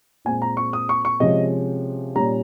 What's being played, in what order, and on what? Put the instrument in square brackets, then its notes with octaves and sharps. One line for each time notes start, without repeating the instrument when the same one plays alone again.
[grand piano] A#2 G#3 C4 G#5
A#5
C#6
D#6
C#6
C#6
C3 F3 G#3 C#4 D#5
A#2 G3 C#4 A#5